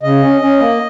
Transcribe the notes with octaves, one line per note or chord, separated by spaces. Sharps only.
C#3 D#5
C#4
C#4
A#3